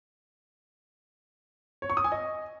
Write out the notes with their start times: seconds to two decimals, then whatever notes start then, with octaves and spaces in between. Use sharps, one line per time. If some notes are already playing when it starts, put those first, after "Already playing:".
1.82 C#5
1.90 C#6
1.97 D#6
2.04 G#5
2.12 D#5